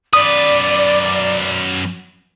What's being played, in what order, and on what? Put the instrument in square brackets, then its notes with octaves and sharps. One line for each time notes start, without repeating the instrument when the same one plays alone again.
[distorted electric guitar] F#2 B4 [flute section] D5 [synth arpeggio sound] D#6